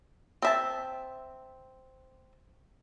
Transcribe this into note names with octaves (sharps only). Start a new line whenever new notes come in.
C4 E5 A5